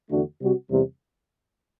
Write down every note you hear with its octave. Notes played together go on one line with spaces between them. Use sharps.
E2 D3 A3 D4 F#4
C3 G3 C4 F#4
E2 C3 G3